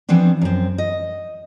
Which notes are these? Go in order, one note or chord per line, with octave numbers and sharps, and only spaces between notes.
E3 F3 B3 C4 D4
F#2 C4
D#5